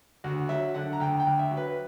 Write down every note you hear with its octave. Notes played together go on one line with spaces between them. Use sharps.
D2 F#4
F#3 E5
D3 F#5
A#5
D2 G5
G5
D2
E5
F#3
B4